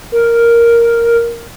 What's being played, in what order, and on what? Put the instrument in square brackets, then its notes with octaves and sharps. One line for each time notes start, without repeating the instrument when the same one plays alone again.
[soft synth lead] A#4